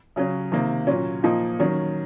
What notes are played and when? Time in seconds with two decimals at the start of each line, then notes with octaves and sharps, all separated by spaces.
0.16 C#3 F#3 C#4
0.52 C3 D#3 A#3
0.87 A#2 F#3 C#4
1.23 A#2 F3 A#3 D#4
1.59 D#3 F#3 C#4